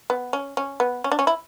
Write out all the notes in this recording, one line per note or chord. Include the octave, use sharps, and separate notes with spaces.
B3
C#4
C#4
B3
C#4
D4
C#4
E4